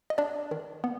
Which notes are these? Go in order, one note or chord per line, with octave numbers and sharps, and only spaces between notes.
D#5
D4 D5
D#3
B3